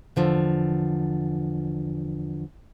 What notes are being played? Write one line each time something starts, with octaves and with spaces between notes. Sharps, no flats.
E2 D3 F3